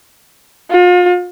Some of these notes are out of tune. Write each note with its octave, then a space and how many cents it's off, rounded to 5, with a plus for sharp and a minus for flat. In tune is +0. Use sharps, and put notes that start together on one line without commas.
F4 +35